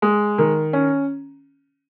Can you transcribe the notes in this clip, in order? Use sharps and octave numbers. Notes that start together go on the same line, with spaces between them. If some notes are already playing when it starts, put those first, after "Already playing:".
G#3
D#3
C#4